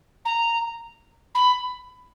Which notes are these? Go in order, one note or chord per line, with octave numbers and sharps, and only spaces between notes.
A#5
B5